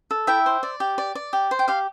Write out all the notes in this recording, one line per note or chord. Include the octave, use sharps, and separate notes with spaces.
A4
E4 E5 G5
C5
D5
G4
D5
D5
G4
C5
G5
G4 F5